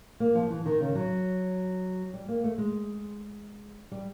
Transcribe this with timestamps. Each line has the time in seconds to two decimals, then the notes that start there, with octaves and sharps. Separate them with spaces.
0.20 A#3
0.35 F3
0.50 E3
0.66 D#3
0.80 C#3
0.95 F#3
2.14 G3
2.28 A#3
2.44 A3
2.58 G#3
3.92 G3